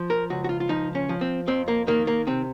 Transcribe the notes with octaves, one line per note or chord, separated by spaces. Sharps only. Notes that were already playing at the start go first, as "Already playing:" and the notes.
Already playing: F3
A#4
C#2 F#4
F#4
F4
F4
F3 D#4
C#4
F3
C4
F2 C4
A#3
D#3 A#3
A#3
C3 C4